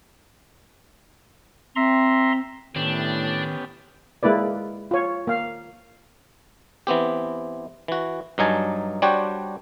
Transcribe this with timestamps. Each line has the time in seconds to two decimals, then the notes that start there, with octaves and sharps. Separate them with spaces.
1.76 C4 E5 A#5 C6
2.76 A2 D#3 B3 C#4 D4 G4
4.23 G#3 A#3 E4 B4 D5
4.91 F4 C#5
5.27 A#3 F5
6.87 E3 B3 C4 G4
7.88 E3 F#4
8.38 G2 F#3 D#4 G#5 A5
9.02 G3 D4 F#4 C5 C#5 G5